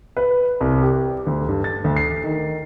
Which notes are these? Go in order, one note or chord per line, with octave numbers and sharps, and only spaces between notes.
B4
C2
G4
D2
G2
A6
D2
C7
D#3